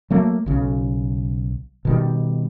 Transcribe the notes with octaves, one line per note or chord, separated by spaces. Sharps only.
F#3 A3 A#3
B1 C#3
B2 D#3 G3